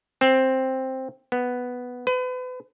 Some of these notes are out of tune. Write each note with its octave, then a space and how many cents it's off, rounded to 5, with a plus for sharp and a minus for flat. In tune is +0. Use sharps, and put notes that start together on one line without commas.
C4 +5
B3 +0
B4 +35